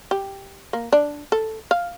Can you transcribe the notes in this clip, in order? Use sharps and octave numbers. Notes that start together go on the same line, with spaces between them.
G4
A#3
D4
A4
F5